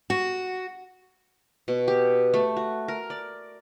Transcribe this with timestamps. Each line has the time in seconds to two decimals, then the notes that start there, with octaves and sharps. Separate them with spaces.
0.10 F#4
1.68 B2
1.88 G4
2.34 A3
2.57 F#4
2.88 A#4
3.10 D5